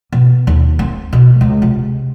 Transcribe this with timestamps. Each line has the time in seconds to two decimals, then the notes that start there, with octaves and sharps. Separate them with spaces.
0.12 B2
0.47 D#2
0.79 C4
1.13 B2
1.41 C#2
1.62 C3